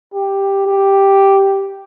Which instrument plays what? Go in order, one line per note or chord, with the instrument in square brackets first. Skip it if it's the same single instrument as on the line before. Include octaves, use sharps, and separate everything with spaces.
[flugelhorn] G4
G4